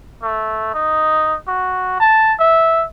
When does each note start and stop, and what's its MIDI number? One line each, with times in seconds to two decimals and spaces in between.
0.23 0.74 57
0.74 1.36 63
1.48 1.98 66
2.00 2.34 81
2.39 2.86 76